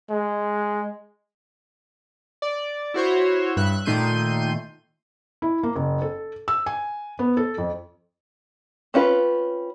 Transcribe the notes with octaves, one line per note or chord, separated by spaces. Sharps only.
G#3
D5
E4 F#4 C5 C#5
G2 E5 F#6
A#2 D#3 A3 C6 G6 D#7
E4
A#3
F#1
A4
E6
G#5
B3
A4
F2
C4 C#4 F4 B4